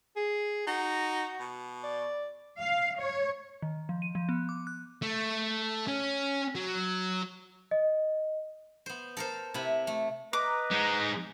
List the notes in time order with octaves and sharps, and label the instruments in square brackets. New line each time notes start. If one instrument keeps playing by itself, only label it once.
[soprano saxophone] G#4
[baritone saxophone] D#4 [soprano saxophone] F#4
[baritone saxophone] B2
[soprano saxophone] D5
[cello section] F5
C#5
[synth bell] D#3
F3
D#7
F3
B3
D6
F#6
[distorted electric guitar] A3
C#4
F#3
[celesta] D#5
[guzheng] B3 C5
A4 A#4 C5
C3 E4 B5
A3
[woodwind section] B4 D#5 A#5 [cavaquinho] D6
[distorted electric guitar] G#3 D#4